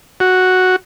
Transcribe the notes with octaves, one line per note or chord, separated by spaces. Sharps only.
F#4